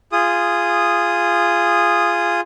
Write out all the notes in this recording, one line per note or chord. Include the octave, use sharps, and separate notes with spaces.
F4 G#4 D#6